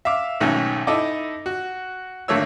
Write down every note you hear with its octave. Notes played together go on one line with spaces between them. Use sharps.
E5 F5 D6
B1 G#2 D#3 A3 C#4
D#4 E4 A4 D#5 D6
F#4
G#1 D3 A3 A#3 C#5 E6